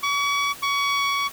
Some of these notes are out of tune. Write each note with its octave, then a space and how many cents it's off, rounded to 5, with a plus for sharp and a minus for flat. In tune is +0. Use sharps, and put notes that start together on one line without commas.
C#6 +40
C#6 +25